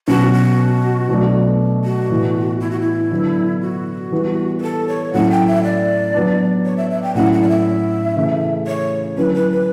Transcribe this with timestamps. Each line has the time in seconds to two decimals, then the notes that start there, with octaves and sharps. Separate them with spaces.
0.08 B2 F#3 C#4 F#4
0.33 F#4
1.09 B2 F#3 A3 D4
1.84 F#4
2.10 A2 E3 B3
2.60 E4
2.71 F#4
2.80 E4
3.11 D3 F#3 B3 D4
3.61 F#4
4.12 E3 G3 B3
4.59 B4
4.62 A4
4.88 C#5
5.13 A2 F#3 A3 C#4 E4 F#5
5.30 G5
5.47 E5
5.64 D5
6.14 F#3 B3 D4
6.65 C#5
6.77 E5
6.90 E5
7.03 G5
7.15 A2 F#3 C#4 E4 F#5
7.33 F#5
7.42 D5
7.49 E5
8.16 C#3 E3 A3
8.67 C#5
9.17 D3 F#3 C#4 E4 B4
9.34 B4
9.51 B4